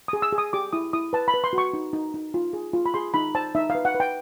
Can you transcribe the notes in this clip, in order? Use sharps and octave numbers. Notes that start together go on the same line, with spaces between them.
G#4 D#6
E6
G#4
D#6
G4 D6
E4 D#6
E4 D#6
B4 A5
B5
B4
C6
F#4
C#6
D#4
D#4
D#4
F4
G#4
F4
B5
G#4 C6
D#4 B5
C5 A5
D#4 E5
F5
B4
F#5
B4
G5